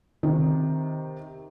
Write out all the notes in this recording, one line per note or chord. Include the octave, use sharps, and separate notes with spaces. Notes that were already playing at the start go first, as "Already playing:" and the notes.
C3 D#3